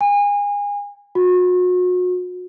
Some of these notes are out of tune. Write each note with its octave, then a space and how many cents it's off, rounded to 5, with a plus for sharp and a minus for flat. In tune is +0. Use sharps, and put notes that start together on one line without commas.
G#5 -30
F#4 -35